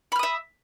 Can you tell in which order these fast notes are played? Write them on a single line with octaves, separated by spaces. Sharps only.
B5 F6 D#6 E5